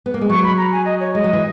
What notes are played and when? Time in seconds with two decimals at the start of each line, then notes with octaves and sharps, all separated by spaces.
0.06 B3
0.14 A#3
0.21 G#3
0.29 F#3 C#6
0.43 B5
0.57 A#5
0.72 G#5
0.85 D#5
1.00 C#5
1.14 G#3 D#5
1.24 F#3
1.33 E3